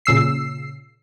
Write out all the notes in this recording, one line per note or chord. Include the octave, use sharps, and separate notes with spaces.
A#2 C#3 E6 C7